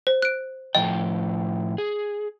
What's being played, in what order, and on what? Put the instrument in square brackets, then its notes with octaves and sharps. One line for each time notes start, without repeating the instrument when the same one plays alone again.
[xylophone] C5
F#6 D7
[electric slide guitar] A2 F3 G5 [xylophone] D#5
[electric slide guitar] G#4